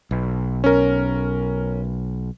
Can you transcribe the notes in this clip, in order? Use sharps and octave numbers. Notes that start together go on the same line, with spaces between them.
B1
C#4 A#4